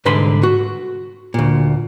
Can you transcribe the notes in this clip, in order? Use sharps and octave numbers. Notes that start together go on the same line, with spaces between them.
C2 G#2 D3 B4 B5 C6
F#4
D2 A#2